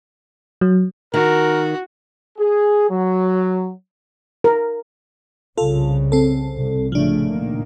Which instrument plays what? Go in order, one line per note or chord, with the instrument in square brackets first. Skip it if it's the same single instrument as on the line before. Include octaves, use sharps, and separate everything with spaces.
[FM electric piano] F#3
[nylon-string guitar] D#3 [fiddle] F#4 [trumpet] A#4
[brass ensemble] G#4
F#3
[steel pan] A#4
[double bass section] C2 C#3 [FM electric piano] F4 A4
[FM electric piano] C4 A4
[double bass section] C2
[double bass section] A2 C#3 A3 [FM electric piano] F3 D4
[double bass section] A#2 D#3 A#3